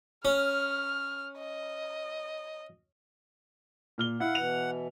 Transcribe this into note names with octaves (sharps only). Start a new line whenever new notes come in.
C#4 F6
D#5
A#2 F6 G7
E4 F5 F#5
B2 E3 F7